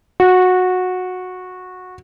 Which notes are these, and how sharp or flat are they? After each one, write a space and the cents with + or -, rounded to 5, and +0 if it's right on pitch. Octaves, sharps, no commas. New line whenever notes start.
F#4 -15